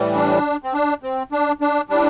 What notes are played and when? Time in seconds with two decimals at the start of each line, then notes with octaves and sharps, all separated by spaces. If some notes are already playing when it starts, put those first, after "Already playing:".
Already playing: A2 E3 G3
0.16 D4
0.64 C4
0.74 D4
1.03 C4
1.32 D4
1.61 D4
1.89 A2 G3 D4